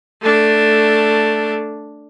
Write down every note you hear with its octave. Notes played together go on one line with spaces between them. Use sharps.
A3 D4